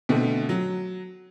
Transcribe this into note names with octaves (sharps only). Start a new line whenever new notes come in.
B2 D3 A3 C4
F#3